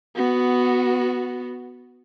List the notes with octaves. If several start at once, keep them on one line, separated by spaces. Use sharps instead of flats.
B3 F#4